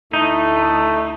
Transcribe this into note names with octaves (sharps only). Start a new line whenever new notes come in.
D2 A3 D#4 E4